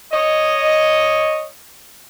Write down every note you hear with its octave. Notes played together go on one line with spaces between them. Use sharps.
C#5 D#5